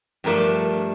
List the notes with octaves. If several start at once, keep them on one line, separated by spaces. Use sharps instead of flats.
G2 F3 A3 D4 A#4